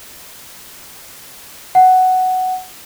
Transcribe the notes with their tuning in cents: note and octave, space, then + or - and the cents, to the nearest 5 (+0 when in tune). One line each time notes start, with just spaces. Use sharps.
F#5 +5